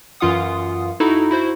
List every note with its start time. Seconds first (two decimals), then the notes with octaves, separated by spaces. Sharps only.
0.20 F#2 E3 F4 F5 F#5 D#6
1.00 D#4 E4 F#4 A4
1.31 E4 F#4 C5